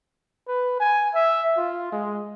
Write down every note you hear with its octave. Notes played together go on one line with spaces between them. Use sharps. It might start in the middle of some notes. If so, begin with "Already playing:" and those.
B4
G#5
E5
F4
G#3